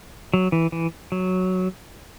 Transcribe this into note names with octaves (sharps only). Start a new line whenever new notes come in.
F#3
E3
E3
F#3